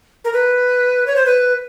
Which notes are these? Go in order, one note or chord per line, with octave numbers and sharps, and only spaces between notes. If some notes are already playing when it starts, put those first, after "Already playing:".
A#4
B4
C#5
C5
B4